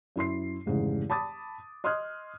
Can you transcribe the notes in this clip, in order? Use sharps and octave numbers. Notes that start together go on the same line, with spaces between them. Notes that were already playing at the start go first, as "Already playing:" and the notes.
F#2 E4 C6 C7
F1 G#2 C#3 E3
A5 B5 D6 D#6 A6
D#5 C6 D#6 F6 F#6 G#6